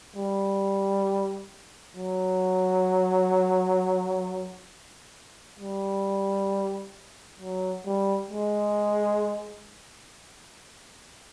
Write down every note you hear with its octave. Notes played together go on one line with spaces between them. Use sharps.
G3
F#3
G3
F#3
G3
G#3